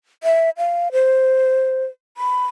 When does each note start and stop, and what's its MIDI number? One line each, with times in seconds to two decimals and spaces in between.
0.24 0.50 76
0.58 0.89 77
0.92 1.85 72
2.17 2.46 83